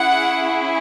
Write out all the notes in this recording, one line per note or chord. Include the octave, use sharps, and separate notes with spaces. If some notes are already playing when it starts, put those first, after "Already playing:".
Already playing: C#4 E4 G#4 F#5